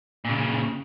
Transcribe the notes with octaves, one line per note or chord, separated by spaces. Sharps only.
A#2 C#3